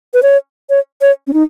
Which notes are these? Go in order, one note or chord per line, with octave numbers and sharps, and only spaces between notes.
B4
C#5
C#5
C#5
C#4
D#4